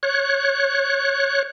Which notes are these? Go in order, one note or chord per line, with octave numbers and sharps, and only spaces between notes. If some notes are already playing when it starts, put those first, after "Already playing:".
C#5 F#6